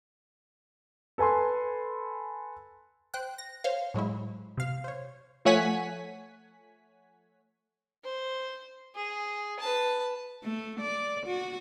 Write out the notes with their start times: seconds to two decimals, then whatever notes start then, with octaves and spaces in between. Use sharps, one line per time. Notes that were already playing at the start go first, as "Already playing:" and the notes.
1.18 A4 B4 G#5 A5 C6
3.14 C5 G5 F#6
3.38 A#6
3.64 C5 C#5 F5
3.94 A2 F#3 G#3 E4
4.57 C3 F5
4.84 C5 C#5
5.45 F3 A3 C#5 F#5 G#5 B6
8.04 C5
8.95 G#4
9.59 B4 A5
10.43 A3
10.80 D5
11.26 F#4